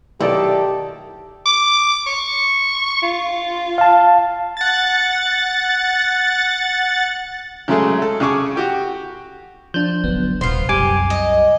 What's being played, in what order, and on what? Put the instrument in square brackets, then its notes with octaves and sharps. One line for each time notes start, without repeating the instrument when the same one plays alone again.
[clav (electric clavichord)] B1 [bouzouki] D#3 A4 [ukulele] E4 D5 [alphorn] G4
[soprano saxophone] D6
C#6
F4
[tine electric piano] F5 A5
[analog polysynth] F#5 A6
[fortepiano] C#3 F#3 G#3 A3 G#4
A4
C#3 G#4 G#5 C#6 D6
F#4 G4 G5
[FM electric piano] F3 D4 [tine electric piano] G6
[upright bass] D3 F#3 [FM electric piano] B3
[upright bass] D#1 [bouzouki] B3 F4 [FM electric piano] C5 C7
[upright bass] C2 F#2 [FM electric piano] G3 [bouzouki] G4 [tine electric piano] G#5 D6
[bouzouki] D#5